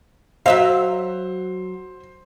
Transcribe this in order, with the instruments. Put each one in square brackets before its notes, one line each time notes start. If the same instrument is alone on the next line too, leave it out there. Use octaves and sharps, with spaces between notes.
[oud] F#3 E5 F5 [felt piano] C5